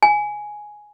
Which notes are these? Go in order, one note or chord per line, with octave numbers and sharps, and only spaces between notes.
G#5